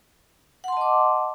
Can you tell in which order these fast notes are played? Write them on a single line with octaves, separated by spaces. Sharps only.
F#5 C6 A5 D#5 D6